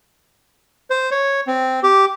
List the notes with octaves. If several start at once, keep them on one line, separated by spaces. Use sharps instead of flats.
C5
C#5
C4
G4